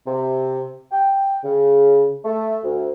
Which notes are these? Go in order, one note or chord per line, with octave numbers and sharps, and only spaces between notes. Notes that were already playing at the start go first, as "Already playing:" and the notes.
C3
G5
C#3
A3
D2